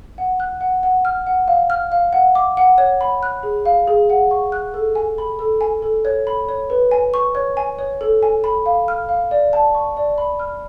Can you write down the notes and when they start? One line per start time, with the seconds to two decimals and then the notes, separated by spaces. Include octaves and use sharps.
0.18 F#5
0.40 F#6
0.61 F#5
0.83 F#5
1.05 F6
1.27 F#5
1.48 F5
1.70 F6
1.92 F5
2.13 F#5
2.35 D6
2.57 F#5
2.78 C#5
3.01 B5
3.23 F#6
3.43 G#4
3.66 F5
3.87 G#4
4.10 F#5
4.31 C#6
4.52 F#6
4.74 A4
4.95 G#5
5.18 B5
5.39 A4
5.61 G#5
5.82 A4
6.05 C#5
6.27 B5
6.49 C#5
6.70 B4
6.91 G#5
7.14 C#6
7.35 C#5
7.57 G#5
7.79 C#5
8.01 A4
8.23 G#5
8.44 B5
8.66 F5
8.88 F6
9.09 F5
9.31 D5
9.53 A5
9.75 C#6
9.97 D5
10.18 B5
10.39 F6